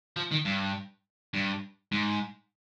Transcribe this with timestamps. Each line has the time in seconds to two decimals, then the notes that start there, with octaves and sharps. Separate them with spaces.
0.16 F3
0.32 D#3
0.45 G2
1.34 G2
1.92 G#2